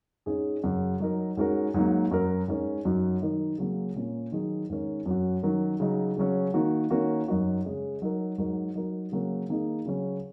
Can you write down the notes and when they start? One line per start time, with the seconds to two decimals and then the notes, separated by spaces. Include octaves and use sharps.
0.26 G#2 G#3 C#4 G#4
0.63 F#2 C#3 F#3
1.00 F#3 D#4 A#4
1.37 G#2 G#3 C#4 F#4 A#4
1.74 G#2 F#3 A#3
2.11 F#2 F#3 C#4 A#4
2.48 G#2 G#3 C#4 A#4
2.85 F#2 F#3 D#4 F#4
3.22 D#3 F#3 D#4 A#4
3.58 C#3 F#3 A#3 C#4
3.96 A#2 A#3 C#4
4.32 D#3 F#3 D#4 G#4
4.70 G#2 D#3 G#3 C#4 A#4
5.06 F#2 F#3 C#4 F#4
5.43 D#3 F#3 C#4 A#4
5.80 C#3 F#3 D#4
6.17 C#3 F#3 C#4
6.54 D#3 A#3 F#4
6.90 D#3 A#3 C#4 F#4 A#4
7.27 F#2 F#3 D#4 F#4 A#4
7.65 C#3 G#3 C#4
8.02 F#3 D#4 A#4
8.38 G#2 F#3 D#4 A#4
8.75 F#3 D#4 F#4 A#4
9.12 C#3 F#3 A#3 C#4 A#4
9.49 D#3 A#3 D#4 G#4
9.86 C#3 F#3 C#4